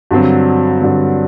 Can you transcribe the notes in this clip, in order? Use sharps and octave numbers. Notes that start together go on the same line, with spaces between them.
G2 D3 F#3 C4
G2 D3 F#3 C4